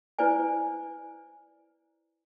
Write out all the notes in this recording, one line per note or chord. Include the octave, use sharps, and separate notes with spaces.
E4 B4 C5 D5 G#5